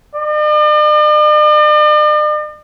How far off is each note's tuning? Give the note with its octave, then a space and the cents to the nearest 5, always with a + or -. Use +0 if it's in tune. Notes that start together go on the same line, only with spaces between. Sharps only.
D5 +45